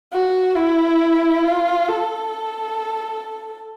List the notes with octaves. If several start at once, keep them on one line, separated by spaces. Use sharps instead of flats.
F#4
E4
F4
A4